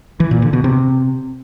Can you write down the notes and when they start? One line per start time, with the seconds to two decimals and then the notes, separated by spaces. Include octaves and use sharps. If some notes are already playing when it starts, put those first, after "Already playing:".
0.20 E3
0.31 A#2
0.42 D3
0.53 B2
0.64 C3